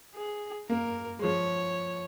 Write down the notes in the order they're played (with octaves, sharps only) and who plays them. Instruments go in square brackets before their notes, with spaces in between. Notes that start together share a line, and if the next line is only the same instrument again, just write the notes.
[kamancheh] G#4
[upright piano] A#3 [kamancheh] A#4
[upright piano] G#3
[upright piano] F3 [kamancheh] C#5